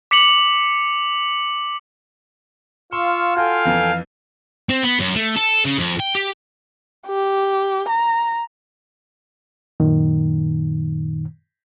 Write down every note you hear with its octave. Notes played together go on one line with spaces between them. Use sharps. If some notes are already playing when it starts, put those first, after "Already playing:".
D6 B6 C#7 F7 F#7
F4 F5 C6 C#6 E6
F#4 A4 F5 G5 G#5
F2 E3
C4
B3
F#2
A3
A4
C#3
F2
G5
G4
G4
A#5
F#2 A#2 D#3